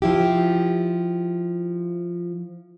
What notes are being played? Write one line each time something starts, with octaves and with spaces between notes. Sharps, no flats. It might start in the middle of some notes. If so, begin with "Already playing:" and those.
F3 E4 G4